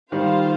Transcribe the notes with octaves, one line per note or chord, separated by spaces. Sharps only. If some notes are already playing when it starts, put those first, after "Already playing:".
D#3 G3 F4 C5 F5